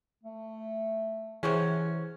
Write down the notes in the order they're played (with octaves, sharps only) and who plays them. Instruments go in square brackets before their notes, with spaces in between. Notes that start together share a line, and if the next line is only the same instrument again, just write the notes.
[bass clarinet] A3
[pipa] C3 F#3 C#4 [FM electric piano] E3 [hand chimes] G#4 C5